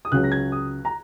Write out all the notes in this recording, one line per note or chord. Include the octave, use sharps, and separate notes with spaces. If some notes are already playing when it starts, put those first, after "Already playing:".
D#6
C#2 C#3 F#3 F#6
A#6
G#6
D#6
A#5